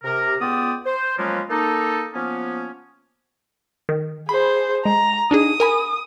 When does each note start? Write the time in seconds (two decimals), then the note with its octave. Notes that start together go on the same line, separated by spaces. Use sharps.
0.03 C3 A#4
0.40 C#2 B3 F4 D5 G5 D#6
0.86 C5
1.18 F3 F#3 G#3 A#3 B3 C#4
1.50 A#3 D#4 A4
2.15 F3 A#3 B3 C#4
3.89 D#3
4.29 G#4 C5 B5
4.85 G#3 A#5
5.31 D4 D#4 G#4 D#6
5.60 A#4 G#5 B5